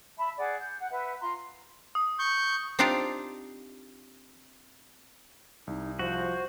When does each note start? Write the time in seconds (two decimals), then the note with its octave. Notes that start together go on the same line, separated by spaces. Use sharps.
0.17 E5 A5 B5
0.37 G#4 D5 F#5 G#5
0.58 G6
0.78 F#5
0.90 B4 E5 F#5
1.20 F4 A#5 C6
1.95 D#6
2.19 C#6 G6
2.79 C4 D4 D#4 F4 G4 F5
5.67 C2 D#4
5.99 F3 F#4 C5